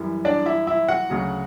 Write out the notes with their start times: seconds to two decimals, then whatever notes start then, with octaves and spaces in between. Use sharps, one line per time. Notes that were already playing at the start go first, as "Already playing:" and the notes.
Already playing: F#2 E3 G3
0.25 D4 D5
0.46 E4 E5
0.67 E4 E5
0.88 F#4 F#5
1.10 D2 C#3 F#3